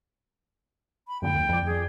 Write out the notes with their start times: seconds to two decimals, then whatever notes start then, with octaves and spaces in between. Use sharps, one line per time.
1.08 B5
1.22 F#2 A#2 D3 G5
1.35 D#2
1.49 F2 D5
1.66 G#4